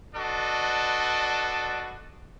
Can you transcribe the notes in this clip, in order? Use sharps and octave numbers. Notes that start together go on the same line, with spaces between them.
D4 F#4 A4 B4 D5 D#5